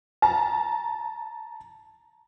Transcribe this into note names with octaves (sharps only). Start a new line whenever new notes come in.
A5 A#5